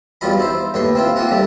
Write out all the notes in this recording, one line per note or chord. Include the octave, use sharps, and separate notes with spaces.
E2 F#3 G3 F4 D#5 B5
D#4 E4 C5
D#2 A2 B4 C#5 C6
C4 E4 F4
A#3 C4 F4 F#5 A#5
D#3 G3 A3 D4